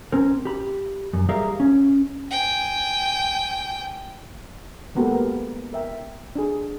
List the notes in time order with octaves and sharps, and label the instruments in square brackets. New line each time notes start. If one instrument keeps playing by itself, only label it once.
[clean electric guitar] C4 C#4 A#4
G4 B5
F#2
G3 G4 G#4 A#4 E5 F5
C#4
[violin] G5 G#5
[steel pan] G#3 A#3 B3 F#4 G4 A4
A#3 A#4
A#4 E5 G5
D4 G#4